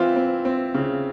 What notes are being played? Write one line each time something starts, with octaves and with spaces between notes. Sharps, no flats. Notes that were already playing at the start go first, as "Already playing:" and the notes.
Already playing: E3 C4 E4 F4
C4
C4
C#3